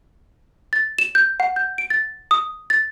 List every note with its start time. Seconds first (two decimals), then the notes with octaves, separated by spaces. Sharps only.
0.73 A6
0.98 E7
1.15 G6
1.40 F#5
1.56 G6
1.78 D7
1.90 A6
2.31 D#6
2.70 A6